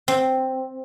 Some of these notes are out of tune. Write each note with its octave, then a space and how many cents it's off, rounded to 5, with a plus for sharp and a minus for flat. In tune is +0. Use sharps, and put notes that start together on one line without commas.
C4 +0